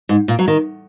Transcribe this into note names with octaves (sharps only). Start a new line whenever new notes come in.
G#2
A#2
F#3
D#3